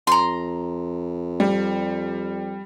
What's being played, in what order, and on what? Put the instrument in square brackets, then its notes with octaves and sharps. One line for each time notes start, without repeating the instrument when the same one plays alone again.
[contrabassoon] F2 [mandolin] A#5 C6
[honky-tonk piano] G3